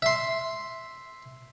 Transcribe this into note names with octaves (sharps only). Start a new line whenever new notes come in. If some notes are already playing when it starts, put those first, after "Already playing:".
E5 C6